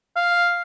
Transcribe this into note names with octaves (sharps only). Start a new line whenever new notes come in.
F5